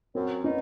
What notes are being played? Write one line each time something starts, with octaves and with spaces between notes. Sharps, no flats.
F#2 C4
B3 C#4 D#4